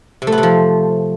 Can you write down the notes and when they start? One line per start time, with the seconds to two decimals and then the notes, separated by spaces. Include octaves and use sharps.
0.22 C3
0.27 A3
0.32 B3
0.38 C3
0.43 F3